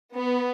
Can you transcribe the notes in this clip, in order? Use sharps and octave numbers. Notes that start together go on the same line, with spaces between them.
B3